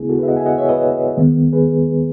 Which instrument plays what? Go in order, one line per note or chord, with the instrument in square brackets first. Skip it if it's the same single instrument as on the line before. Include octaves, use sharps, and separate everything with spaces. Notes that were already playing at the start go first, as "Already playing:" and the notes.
Already playing: [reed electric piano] D#2 C#3 G#3 B3 E4 G#4
F#4 A4
G#4 B4
E5
D#5 F#5
E5 G#5
D#5 F#5
C#5 E5
B4 D#5
D#2 D#3 G#3 B3
G#4 B4